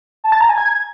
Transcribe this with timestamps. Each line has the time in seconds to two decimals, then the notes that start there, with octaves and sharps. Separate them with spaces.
0.24 A5
0.32 A6
0.41 A#5
0.49 G#5
0.58 G#6